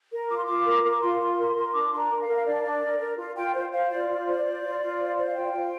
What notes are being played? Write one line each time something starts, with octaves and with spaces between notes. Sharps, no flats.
A#4
F4 D6
C6
F4 D6
A#4
A#4
D6
F4 C6
F4
A#4
A#4
D4 D6
D4 C6
A#5
A#4
F5
A#4
F5
D4 D5
D4
A#4
A#4
F4
F4 G5
C5
C5 F5
F4 D5
F4
C5
C5
F4
F4
C5
C5 D5
F5
F4 G5
F4